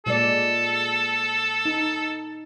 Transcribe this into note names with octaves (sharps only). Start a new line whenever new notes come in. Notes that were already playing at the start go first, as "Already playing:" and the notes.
A#2 G#3 A4 D5
D#4